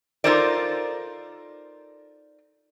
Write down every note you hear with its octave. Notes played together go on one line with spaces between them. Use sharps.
D#4 F4 A4 A#4 C5 D5